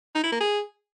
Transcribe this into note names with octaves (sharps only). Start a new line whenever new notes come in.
D#4
E4
A#3
G#4